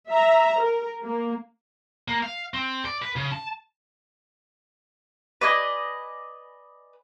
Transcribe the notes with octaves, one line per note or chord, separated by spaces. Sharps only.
E5 A#5
A#4
A#3
A#3
F5
C4
D5
B4
C#3
A5
B4 D5 D#5 G#5